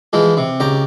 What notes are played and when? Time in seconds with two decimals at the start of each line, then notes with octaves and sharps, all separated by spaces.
0.13 E3 F3 G#3
0.37 C3
0.60 C#2 G4 A#5